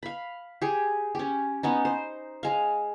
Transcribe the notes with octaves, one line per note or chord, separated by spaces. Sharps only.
F5 B5
G4 G#4
C#4 G4
B3 C#4 D#4
C5
G#3 F5